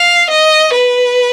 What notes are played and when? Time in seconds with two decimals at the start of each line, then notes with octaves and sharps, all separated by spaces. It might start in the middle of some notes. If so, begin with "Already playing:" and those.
Already playing: F5
0.31 D#5
0.73 B4